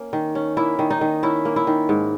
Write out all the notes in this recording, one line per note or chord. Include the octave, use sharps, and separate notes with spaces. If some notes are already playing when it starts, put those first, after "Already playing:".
Already playing: A#3 C#4
D#3
C#4
A#3 E4
D#3
D#4
D#3
C#4 E4
A#3
E4
D#3
G#2